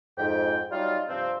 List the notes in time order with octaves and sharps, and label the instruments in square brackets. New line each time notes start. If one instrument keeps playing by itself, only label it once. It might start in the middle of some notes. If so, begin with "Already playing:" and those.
[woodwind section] F2 G#2 G5
F#3 G3 D#4 F4
G2 C3 F3 C4